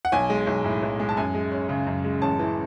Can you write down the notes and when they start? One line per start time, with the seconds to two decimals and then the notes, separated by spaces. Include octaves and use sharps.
0.05 F#5
0.12 B1 G#5
0.30 G#3
0.47 B1
0.64 A2
0.82 B1
1.00 G#3
1.09 A5
1.17 F#2 G#5
1.35 G#3
1.52 C#4
1.69 C#3
1.87 F#2
2.04 G#3
2.22 A1 A5
2.39 E3